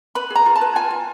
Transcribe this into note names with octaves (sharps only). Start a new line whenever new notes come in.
B4 B5
G#4
A#5
F4
A5
B4
F4 G#5
F4